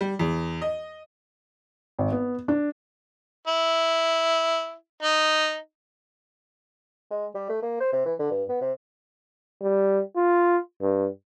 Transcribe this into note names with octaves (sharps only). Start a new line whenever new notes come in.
G3
E2
D#5
G#1
B3
D4
E4
D#4
G#3
G3
A3
A#3
C5
C3
E3
D3
G2
B3
C3
G3
F4
G2